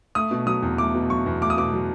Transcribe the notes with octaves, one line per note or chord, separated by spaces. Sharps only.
A3 D#6
B2
F#3 D#6
E2
A3 D6
B2
F#3 C#6
E2
A3 D6
D#6
B2 D6
F#3